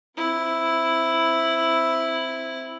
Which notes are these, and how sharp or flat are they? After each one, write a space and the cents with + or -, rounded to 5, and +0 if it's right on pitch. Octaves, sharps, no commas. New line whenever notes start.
C4 +0 E4 +0